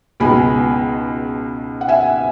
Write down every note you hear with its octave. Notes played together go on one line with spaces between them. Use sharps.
C#2 B2 G#3 B3 D#4 G#5 B5
F#5
E5 G#5